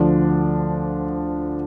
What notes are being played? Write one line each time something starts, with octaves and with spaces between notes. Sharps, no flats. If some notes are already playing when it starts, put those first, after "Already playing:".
Already playing: D2 D3 F3 D4